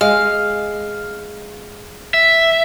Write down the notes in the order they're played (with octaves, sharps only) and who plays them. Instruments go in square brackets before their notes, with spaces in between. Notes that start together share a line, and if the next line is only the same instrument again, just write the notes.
[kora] G#3 [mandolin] F5
[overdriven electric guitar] E5